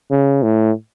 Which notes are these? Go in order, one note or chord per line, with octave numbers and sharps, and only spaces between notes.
C#3
A2